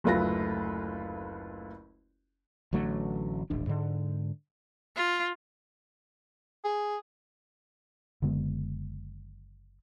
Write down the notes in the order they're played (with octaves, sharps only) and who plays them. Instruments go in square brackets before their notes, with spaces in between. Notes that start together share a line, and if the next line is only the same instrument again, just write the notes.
[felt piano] F#1 D2 A3 F4 B4 A#6
[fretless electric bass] A1 D3 F#3 A3
D#1 A1 D4
G#2 D3
[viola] F4
[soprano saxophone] G#4
[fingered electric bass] F#1 D3 G#3 B3